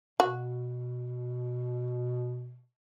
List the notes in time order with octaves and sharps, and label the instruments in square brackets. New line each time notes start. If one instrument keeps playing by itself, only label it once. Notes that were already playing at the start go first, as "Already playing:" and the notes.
[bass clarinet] B2 [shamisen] F#4